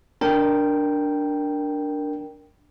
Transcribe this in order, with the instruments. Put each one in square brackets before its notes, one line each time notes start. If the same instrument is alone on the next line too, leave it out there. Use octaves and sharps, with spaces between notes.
[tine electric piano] D4 A#4 G5